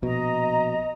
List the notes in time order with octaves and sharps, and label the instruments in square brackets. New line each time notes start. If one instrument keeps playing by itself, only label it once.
[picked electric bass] A#1 B2 [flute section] D#5 A#5